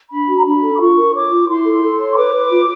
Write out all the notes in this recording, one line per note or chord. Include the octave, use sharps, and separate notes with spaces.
D4 B5
F#4
A#5
D4 B5
A4
D6
F4 C#6
A#4
C#5 D6
F4
E4 C6
A4
A4
C#5
C#6
B4 D6
B4
F4